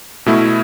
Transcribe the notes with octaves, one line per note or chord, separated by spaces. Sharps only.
B2 A3 E4